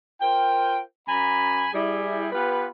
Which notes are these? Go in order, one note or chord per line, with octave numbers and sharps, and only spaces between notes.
F4 A#4 C5 G5
F#2 G#5 A#5 B5
G3 E4 G#4
B3 F4 G4 B4